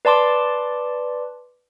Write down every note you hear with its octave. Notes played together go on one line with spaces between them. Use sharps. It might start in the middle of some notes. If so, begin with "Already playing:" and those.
B4 D5 A5 C6 D6